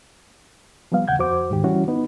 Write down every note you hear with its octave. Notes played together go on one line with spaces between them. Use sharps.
F3 G3 B3 F5
D#2 C#3 F#5 G6 G#6
F2 F#4 C5 D6
D2 G#2 D#3 G4
E3 G3 C#4 E4 F#4
B3 D#4 B4